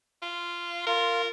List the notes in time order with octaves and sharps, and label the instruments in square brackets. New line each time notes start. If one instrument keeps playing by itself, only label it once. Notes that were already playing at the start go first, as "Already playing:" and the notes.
[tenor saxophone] F4
[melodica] F4 [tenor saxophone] A#4